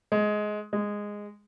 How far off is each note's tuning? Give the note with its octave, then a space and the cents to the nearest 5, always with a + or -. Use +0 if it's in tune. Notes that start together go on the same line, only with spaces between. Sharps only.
G#3 +15
G#3 -10